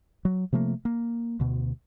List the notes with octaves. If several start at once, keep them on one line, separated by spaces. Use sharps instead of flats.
F#3
C3 F3 A3 A#3
A#3
D2 B2